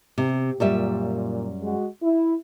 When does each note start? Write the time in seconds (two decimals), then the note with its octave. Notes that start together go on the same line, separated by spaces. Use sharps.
0.18 C3
0.60 F#2 A#2 G3 E5
1.62 G#3 F#4
2.02 E4